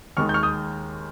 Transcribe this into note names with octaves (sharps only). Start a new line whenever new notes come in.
D#2 D#3 G#3 C#6 F6
G6
C#6 F6
D#6 G6